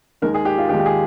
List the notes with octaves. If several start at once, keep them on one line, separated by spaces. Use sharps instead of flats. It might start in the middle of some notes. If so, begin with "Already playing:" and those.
D#2 D#3 G#3 A#4
G#4
G4
F4
D#2 D#3 G#3 G4
G4
G#4